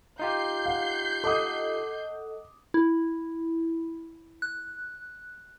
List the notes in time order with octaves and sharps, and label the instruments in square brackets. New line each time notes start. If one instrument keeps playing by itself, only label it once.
[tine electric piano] D#4 F4 G4 [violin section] G6 C7
[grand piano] F5 F#5
[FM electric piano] A4 D#5 F#5 [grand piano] D6 D#6
[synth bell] E4
F#6